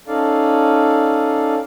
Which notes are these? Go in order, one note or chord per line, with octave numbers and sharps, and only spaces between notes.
C#4 D#4 A4 D5 F5